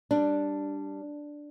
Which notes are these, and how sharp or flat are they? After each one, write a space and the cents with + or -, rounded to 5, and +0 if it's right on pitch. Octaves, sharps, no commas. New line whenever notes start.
G3 +0 D4 +0